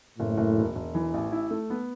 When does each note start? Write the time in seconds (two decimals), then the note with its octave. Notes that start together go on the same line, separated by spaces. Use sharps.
0.19 F#1 A2
0.37 F#1
0.57 E1
0.75 E1
0.95 E3
1.14 A1
1.32 E4
1.51 A3
1.70 B3